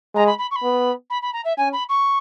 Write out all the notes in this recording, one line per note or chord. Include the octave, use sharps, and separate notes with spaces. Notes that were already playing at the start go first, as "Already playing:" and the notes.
G#3 A#5
B5
B5
C#6
B5
B3
B5
B5
A#5
E5
C#4 G#5
B5
C#6